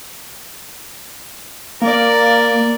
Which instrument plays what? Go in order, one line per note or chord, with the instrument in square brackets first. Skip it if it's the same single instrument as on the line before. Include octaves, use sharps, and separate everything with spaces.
[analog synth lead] A#3 [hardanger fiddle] A#4 D5